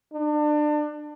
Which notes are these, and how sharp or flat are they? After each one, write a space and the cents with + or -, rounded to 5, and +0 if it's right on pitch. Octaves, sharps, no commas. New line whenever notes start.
D4 +30